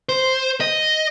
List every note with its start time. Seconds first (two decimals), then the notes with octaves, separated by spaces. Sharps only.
0.09 C5
0.61 D#5